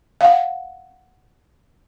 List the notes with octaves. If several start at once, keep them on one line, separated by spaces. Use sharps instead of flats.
F5 F#5